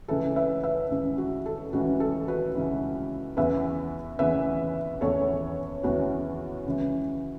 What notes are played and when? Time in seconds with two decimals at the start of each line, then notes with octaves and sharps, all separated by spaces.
0.08 C#2 C#3 E3 A4
0.36 B4 E5
0.64 B4 E5
0.91 C#2 C#3 E3
1.18 F#4
1.46 A4
1.73 C#2 C#3 E3 F#4
2.00 A4
2.28 F#4 B4
2.55 C#2 C#3 E3
3.37 E2 C#3 E3 B4 E5
4.19 E2 C#3 E3 B4 E5
5.01 E2 C#3 E3 A4 C#5
5.83 E2 C#3 E3 F#4 B4
6.66 C#2 C#3 E3